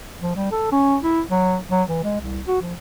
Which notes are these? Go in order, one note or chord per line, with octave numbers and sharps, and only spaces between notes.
F3
G3
A4
C#4
E4
F#3
F#3
E3
G#3
C2
F#4
F3